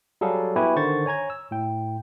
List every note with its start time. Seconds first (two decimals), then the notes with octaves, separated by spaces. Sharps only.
0.21 F#3 G3 G#4 A4 F5
0.56 B3 E4 F#4 G4 B4 G#5
0.76 D3 D#3 C5 C#6 A6
1.06 C#5 G#5 A#5 G#6
1.30 E6
1.51 A2 G5